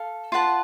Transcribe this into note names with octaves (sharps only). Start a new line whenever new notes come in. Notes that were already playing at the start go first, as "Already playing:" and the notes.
Already playing: A4 F5
F4 B4 F#5 A5